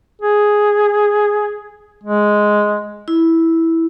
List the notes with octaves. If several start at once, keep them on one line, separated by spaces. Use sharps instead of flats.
G#4
G#3
E4